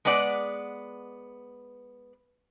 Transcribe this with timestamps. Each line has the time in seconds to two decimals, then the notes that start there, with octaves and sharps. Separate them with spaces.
0.05 G#3 B3 B4 D5 F#5